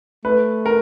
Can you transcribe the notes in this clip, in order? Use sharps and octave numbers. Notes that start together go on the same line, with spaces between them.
A3 B4
A#4